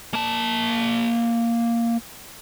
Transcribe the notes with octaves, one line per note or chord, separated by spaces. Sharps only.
A#3 A5